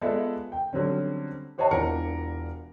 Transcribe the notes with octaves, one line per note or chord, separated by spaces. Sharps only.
G#3 B3 F4 A4 D5 E5
G5
D3 F#3 G3 C4 C#4
G4 C5 C#5 D#5 F#5 A5
E1 E3 D4 F4 A#4 C#7